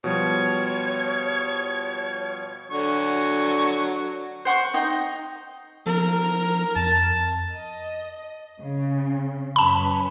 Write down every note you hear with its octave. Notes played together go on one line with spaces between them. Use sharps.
B2 F3 G3 C#5
D3 F#3 C#6
C5 F#5 C6 C#6
D#4 D#5 G5
F3 A#4
F2 A5
D#5
C#3
F#2 C#4 B4 A5 B5